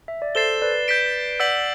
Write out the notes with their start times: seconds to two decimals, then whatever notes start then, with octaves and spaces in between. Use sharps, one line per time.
0.08 E5
0.22 D5
0.35 A4 C5 A6 C7 E7 G7
0.62 B4 D5
0.88 G6 B6 D7
1.40 D5 F#5 E6 G6 B6 D7 F#7